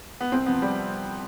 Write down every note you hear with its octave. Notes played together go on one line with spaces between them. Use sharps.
B3
C2 C4
C3 F3 B3
G3